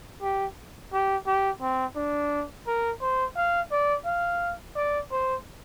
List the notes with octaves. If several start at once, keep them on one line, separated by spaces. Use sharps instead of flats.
G4
G4
G4
C4
D4
A#4
C5
F5
D5
F5
D5
C5